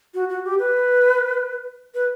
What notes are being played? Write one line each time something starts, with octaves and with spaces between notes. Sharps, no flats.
F#4
F#4
G4
B4
B4